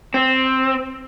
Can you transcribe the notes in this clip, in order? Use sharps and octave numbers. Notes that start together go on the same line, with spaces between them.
C4